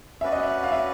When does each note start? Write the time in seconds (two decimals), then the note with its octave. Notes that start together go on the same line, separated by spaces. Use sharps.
0.21 C#4 F#4 B4 D5 E5
0.32 D#5
0.43 E5
0.63 F5
0.72 E5